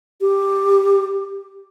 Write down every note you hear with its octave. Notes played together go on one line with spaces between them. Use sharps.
G4